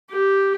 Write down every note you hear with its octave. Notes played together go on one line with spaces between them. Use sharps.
G4